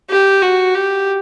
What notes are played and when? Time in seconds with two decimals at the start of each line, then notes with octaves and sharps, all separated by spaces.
0.10 G4
0.42 F#4
0.75 G4